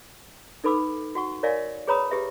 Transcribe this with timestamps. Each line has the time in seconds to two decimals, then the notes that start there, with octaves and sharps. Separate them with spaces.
0.64 D#4 A4 B4 B5 D6 E6
1.15 F#4 F#5 C#6
1.43 A#4 C#5 D5 E5 F5 G#5
1.88 G#4 B4 C#5 A#5 B5 D#6
2.11 G4 G#4 B4 E5